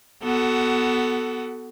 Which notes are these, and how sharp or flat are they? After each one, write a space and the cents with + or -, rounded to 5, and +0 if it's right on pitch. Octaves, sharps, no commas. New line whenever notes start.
B3 +0 F#4 +20 A4 +0